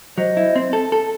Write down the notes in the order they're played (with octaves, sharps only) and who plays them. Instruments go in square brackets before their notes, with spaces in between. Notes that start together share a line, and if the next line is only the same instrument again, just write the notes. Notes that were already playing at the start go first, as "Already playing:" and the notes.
[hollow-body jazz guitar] F#3 [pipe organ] C5 D#5
[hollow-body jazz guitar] E4
C4
A4
A4